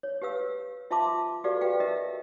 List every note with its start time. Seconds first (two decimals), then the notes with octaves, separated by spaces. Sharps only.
0.03 C#5
0.22 G4 B4 F5 E6
0.91 F4 E5 F5 A5 C6 D6
1.44 F#4 G4 A4 B4 D5 F5
1.61 G4 B4 F5 G5
1.80 G4 A#4 D#5 E5